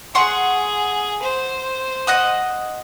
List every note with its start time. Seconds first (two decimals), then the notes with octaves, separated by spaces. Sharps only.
0.15 G#4 F#5 C6 C#6
1.23 C5
2.07 D#5 F#5 D#6